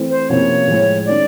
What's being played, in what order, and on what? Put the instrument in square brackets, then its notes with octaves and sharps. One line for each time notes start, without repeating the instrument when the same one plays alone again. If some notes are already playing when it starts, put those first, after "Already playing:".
Already playing: [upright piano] E3 A3 C4
[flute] C5
[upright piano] C3 F3 A#3 C#4 E4 [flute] C#5
[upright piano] A2 F3 G#3
[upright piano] D#3 G#3 C#4 [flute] D5